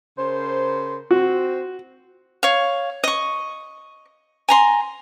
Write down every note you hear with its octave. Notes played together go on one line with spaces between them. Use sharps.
C#3 A#4 C5
C4 F#4
C#5 F5
D#5 C#6
G#5 A#5 C6